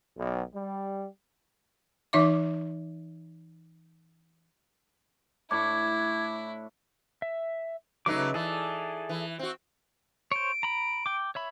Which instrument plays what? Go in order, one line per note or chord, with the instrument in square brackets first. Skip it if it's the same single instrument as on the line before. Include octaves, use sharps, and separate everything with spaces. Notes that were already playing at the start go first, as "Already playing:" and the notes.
[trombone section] B1
G3
[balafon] E3 D#4 E5 D6
[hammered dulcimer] A2 D4 C#6 [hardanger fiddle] E4 [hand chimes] D6 [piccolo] G#6
[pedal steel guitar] E5
[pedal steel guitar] C#3 B4 D6 [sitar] F#3 A3 D#4
[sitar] E3 [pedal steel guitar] G#4 A4 D5
[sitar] E3
C4 F#4
[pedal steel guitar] C5 C#5 [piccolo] D7
[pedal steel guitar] A#5 B5
G5 D6
C#5 E5 B5